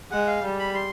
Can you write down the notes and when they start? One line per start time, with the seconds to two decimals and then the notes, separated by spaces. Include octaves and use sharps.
0.11 G#3 F#5
0.27 F5
0.43 G3
0.59 B5
0.75 C6